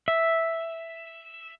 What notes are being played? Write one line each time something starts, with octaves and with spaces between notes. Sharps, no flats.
E5